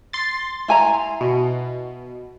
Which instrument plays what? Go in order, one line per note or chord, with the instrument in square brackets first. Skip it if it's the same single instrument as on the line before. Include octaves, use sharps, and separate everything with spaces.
[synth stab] C6 A6
[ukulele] E4 G#5 A#5
[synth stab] B2